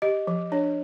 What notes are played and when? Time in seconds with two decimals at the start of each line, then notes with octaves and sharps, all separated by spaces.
0.02 G4 D#5
0.27 F3
0.52 D4 C#5